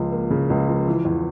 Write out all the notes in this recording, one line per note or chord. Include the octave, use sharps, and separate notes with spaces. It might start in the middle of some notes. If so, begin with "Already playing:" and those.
Already playing: C#2 C#3 F3 A#3
A#3
C#3
C#2
F3
E3
E2